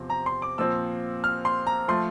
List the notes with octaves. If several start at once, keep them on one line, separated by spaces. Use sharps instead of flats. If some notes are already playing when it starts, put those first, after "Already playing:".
Already playing: E2 C3 F3 C4
A#5
C6
D6
A#2 F3 C4 E6
F6
C6
A#5
F3 A3 C6